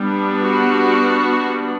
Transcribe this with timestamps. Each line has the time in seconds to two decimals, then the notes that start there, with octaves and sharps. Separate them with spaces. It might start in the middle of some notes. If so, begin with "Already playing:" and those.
Already playing: G3 B3 D4
0.42 F#4